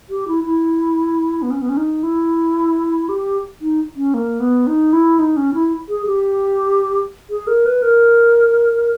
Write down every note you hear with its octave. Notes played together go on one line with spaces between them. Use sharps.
G4
E4
E4
B3
C#4
B3
C#4
D#4
E4
G4
D#4
C#4
A#3
B3
D#4
E4
D#4
C#4
E4
G#4
G4
G#4
A#4
B4
A#4